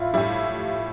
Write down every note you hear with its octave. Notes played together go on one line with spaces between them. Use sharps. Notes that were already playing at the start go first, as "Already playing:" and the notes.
Already playing: A2 E4 F4
A2 G3 E4